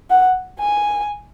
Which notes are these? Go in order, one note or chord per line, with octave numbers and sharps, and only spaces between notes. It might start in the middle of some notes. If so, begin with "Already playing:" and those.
F#5
G#5